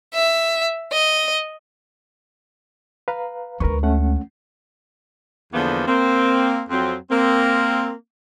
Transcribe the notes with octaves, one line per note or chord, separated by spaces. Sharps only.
E5
D#5
B4 F5 A#5
D2 G#3 A#4 B4 C#6
A3 C#4 F#5
E2 D3 F3 A#3 B3
A#3 C4
F2 F#3 C4
A#3 C4